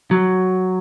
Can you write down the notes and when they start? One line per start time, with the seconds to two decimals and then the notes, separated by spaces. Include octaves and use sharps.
0.11 F#3